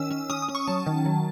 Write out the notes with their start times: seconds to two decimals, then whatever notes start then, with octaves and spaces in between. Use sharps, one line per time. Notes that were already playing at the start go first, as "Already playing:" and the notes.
Already playing: D#3 C#4 E6
0.11 C#4
0.30 C#4 D#6
0.42 D#6
0.49 C#4
0.55 C#6
0.67 F#3 A5
0.87 D#3
1.06 F#3